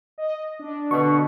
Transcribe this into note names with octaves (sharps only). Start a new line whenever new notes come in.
D#5
D4
B2 D3 C#6